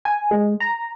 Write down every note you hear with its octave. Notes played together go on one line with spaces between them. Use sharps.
G#5
G#3
A#5